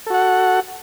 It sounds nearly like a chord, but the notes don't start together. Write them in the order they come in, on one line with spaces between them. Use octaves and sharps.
A4 F#4 F#5